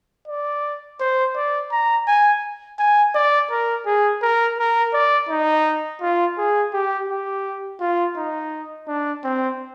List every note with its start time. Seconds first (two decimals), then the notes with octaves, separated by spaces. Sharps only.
0.28 D5
1.00 C5
1.35 D5
1.71 A#5
2.07 G#5
2.79 G#5
3.15 D5
3.50 A#4
3.86 G#4
4.22 A#4
4.58 A#4
4.93 D5
5.29 D#4
6.01 F4
6.37 G#4
6.73 G4
7.09 G4
7.80 F4
8.16 D#4
8.87 D4
9.24 C4